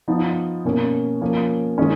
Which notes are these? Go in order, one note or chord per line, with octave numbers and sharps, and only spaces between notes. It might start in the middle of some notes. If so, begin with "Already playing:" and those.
F3 B3 D#4
B2 A#3 C#4
F3 A#3 C#4
D#3 G#3 C#4